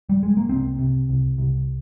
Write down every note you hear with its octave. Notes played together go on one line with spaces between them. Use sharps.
G3
G#3
A#3
C2 C4
C3
C2
C2